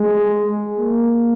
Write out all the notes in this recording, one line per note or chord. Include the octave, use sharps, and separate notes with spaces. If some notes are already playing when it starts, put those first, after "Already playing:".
Already playing: G#3
A#3